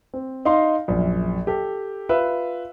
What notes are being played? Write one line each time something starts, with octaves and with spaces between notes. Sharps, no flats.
C4
D#4 D#5 F5 C6
A#1 F#2
G4 A4
F4 B4 E5 F5 E6